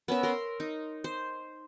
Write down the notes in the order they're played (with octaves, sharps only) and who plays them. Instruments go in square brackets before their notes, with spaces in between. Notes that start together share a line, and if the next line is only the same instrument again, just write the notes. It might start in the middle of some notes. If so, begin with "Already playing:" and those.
[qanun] B3 C#4 A#4 E5
A#4 C6
D#4
C5